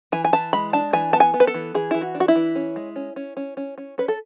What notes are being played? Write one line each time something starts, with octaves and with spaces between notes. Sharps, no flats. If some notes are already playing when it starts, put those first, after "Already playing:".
E3 G#5
G#5
E3 A5
G#3 B5
D4 A5
E3 G#5
B3 A5
G#5
B3
B4
A4
E3
E3 G#4
E3 E4
F#4
D4
F#4
E4
E3
C#4
G#3
C#4
C#4
C#4
C#4
C#4
C#4 B4
A4